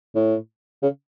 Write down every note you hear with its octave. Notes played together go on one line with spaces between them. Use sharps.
A2
C#3